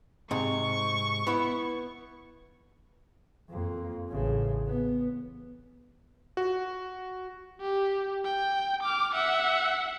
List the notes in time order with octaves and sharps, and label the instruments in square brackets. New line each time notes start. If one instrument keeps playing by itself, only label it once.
[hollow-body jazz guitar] G#2 C3 [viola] C#6
[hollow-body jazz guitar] B3 E4
[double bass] F2 A#3
A1 C#3
B3
[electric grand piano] F#4
[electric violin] G4
G5
D6 F6
E5 F#5